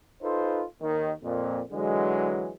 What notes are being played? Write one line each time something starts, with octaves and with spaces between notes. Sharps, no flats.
D#4 F4 A4 B4 C5
D#2 D#3
F2 A#2
D3 E3 F#3 G#3